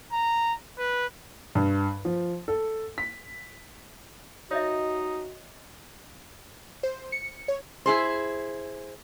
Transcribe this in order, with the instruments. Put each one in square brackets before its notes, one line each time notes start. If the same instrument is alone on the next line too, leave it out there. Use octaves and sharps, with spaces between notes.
[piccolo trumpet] A#5
B4
[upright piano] G2
F3
A4
B6
[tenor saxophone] D#4 [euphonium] F#4 [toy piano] C#5 D#5 E5
[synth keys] C5
C#7
C#5
[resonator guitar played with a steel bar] E4 G#4 C5